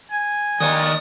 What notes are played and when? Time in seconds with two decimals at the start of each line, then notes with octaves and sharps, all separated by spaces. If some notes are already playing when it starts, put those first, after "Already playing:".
0.11 G#5
0.60 D#3 C#5 D5 D#6